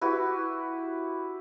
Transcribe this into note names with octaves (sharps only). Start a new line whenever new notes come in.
E4 F#4 G4 B4